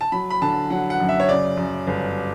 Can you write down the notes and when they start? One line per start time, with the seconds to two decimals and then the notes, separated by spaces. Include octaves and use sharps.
0.01 A5
0.12 F#3 B5
0.30 B5
0.42 D3 A5
0.70 F#3 F#5
0.90 F#5
1.00 F#2
1.09 E5
1.20 C#5
1.28 C#3 D5
1.57 F#2
1.87 G1